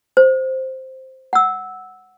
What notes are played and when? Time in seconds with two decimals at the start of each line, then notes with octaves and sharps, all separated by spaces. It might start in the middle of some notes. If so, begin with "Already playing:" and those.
0.17 C5
1.33 F#5 E6